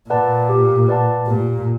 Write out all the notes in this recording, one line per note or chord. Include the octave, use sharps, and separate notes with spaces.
A#2 B4 D5 F#5 A5
G4
B4 D5 F#5 A5
A#2 G4